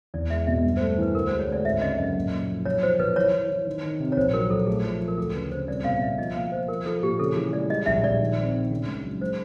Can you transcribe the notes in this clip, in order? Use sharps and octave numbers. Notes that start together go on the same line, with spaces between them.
E2 D5
G#3 E5
B2 E5
G2
C5
A3
C5
E3 B4
D2 A#4
G#3 C5
C#5
D2 D5
G#1 E5
C#3 D#5
F#2 D#5
A#2
A#2
F3
B1 C#5
F3 C5
B1 B4
E3 C#5
E3
E3
D#3
D#3
C3
C#5
A#1 C5
F#3 A#4
A#1 A4
A3 G#4
F3
F3
A#4
D2 A4
C#3 B4
C#3 C5
C2 D5
B2 F5
B2 E5
F3 D#5
A#3 F5
F3 C5
F3 A#4
F3 A4
A#2 G4
C#3 A4
E3 G#4
G#3 D5
G3 D#5
A#1 E5
A#1 D5
D#3
C4
D#3
C#3
C#2
F#3
G#3 C5